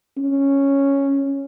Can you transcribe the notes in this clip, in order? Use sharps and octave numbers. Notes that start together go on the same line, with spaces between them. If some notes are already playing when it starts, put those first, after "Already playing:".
C#4